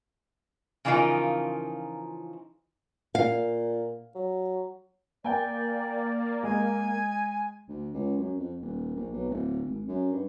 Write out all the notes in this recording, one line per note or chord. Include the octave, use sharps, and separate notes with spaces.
C#3 E3 F3 D#4 F4 A#4
A#2 F5
F#3
A#3 D5 G5 G#5
G#3 G#5
D2
C#2
F#2
F2
D#1
A#1
B1
D1
G#1
F#2
G2